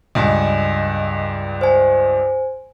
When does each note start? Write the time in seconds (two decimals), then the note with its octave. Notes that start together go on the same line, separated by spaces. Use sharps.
0.15 C#2 G2 D#5 G#5
1.61 C5 G#5